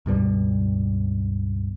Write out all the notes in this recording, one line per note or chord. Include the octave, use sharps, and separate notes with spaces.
C#2 G2 B2 G3